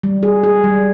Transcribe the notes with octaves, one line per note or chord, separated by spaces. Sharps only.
G3
G#4
G#4
G3